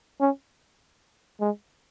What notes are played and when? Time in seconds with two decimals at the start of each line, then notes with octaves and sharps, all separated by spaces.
0.20 C#4
1.40 G#3